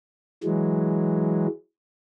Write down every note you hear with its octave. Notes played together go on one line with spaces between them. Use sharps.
E3 F#3 G#3